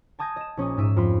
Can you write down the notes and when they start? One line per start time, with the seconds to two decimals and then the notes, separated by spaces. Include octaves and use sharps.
0.19 G#5 A5 D#6 G6 G#6 A#6
0.36 D#5 E7
0.57 A#1 C#4 C#6 D#6
0.77 G#2 E5 D#7
0.96 F2 F4 B5